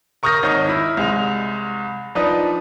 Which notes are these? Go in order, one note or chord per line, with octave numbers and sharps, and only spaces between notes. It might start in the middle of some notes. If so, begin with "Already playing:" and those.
A#4 C#6 D#6 F6 G6 A#6
G#1 D#4 C#5 D#5 D#6
E4 B5
C2 G#3 F7
F3 D4 D#4 B4